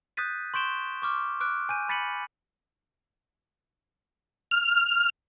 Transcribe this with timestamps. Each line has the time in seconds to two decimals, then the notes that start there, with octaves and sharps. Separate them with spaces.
0.17 D#6 F#6 G6 A6 B6 D#7
0.54 C6 C#6 G6 D7 E7 G7
1.02 C#6 D6 F6
1.41 D6 F6 F#6 D7
1.69 G#5 G6 D#7
1.89 B5 A6 B6 C#7 D#7 F#7
4.51 F6